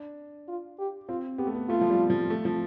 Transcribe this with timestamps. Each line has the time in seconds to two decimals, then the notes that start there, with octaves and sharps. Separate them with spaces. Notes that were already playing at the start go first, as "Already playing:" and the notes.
Already playing: D4
0.48 F4
0.79 G4
1.08 C4 F4
1.38 B3 G4
1.47 A3
1.55 B3
1.69 A3 F4
1.81 F3
1.90 G3
2.10 F3
2.30 A3
2.45 F3